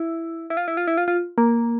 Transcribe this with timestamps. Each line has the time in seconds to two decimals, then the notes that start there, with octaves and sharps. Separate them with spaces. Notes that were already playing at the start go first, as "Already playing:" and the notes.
Already playing: E4
0.50 E4
0.57 F4
0.68 E4
0.77 F4
0.88 E4
0.97 F4
1.08 F4
1.38 A#3